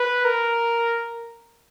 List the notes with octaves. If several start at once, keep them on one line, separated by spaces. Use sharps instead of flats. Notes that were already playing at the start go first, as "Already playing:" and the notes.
Already playing: B4
A#4